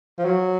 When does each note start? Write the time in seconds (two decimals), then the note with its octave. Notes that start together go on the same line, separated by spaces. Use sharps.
0.19 F3
0.25 F#3